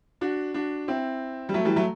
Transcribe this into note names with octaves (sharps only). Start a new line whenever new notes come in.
D4 F#4
D4 F#4
C4 E4
G3
F#3 A3
E3 G3
F#3 A3